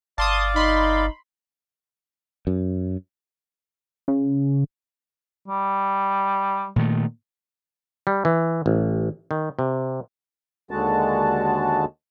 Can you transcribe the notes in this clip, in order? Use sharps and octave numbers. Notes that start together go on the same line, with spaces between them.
G1 D5 F5 A5 C6 D#6
D#4 B5 C6
F#2
C#3
G3
A#2 D#3 A3
G3
E3
A1
D#3
C3
D#2 D3 G#3 F#4 A5